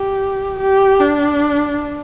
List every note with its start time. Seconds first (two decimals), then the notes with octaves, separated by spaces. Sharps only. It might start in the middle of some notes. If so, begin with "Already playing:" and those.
Already playing: G4
0.59 G4
0.99 D4